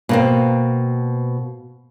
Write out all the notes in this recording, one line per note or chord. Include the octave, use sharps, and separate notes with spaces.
B2 A#3 C4